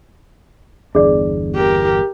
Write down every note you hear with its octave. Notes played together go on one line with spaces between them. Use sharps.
G1 E2 D4 G#4 D5
G4 A#4